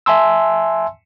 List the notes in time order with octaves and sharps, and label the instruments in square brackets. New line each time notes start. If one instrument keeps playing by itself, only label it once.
[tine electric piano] E5 G#5 A5 C6 E6